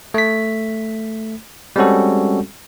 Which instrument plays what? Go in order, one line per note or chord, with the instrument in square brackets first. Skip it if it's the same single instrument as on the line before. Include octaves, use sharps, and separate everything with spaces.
[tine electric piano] A3 B6
G3 G#3 C4 C#4 F#4 A4